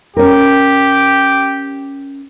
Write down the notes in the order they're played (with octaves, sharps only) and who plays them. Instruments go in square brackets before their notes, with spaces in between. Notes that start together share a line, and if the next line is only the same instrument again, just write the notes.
[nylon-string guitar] C#4 A#4 [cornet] G4